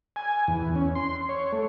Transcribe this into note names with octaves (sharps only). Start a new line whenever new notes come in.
G#5
E2
C#4
C6
C#5
A3